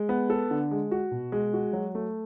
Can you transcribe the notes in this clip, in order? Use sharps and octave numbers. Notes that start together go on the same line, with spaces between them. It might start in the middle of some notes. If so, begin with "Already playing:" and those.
Already playing: G#3
B3
A4
D3
G#3
F#4
B2
G#3
F#4
F#3
A3